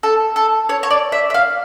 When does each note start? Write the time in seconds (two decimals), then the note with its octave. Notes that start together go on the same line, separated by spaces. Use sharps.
0.03 A4
0.36 A4
0.69 C#5
0.83 C#5
0.91 D5
1.12 E5
1.30 E5
1.34 F5